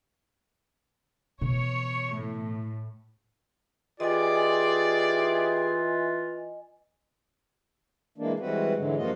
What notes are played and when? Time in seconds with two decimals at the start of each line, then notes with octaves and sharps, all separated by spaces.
1.41 B2 E3 C#5
2.15 A2
4.00 E3 F4 G4 G#4 D5 D#5 G#5
8.18 E3 G#3 A#3 D4
8.40 E3 G3 G#3 C4 F#4 B4
8.76 G#2 D3 E3 F#3 G#3
8.98 G2 F3 A#3 F4 F#4 D#5